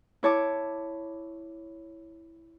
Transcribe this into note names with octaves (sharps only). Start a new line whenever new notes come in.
E4 C#5 A5 D6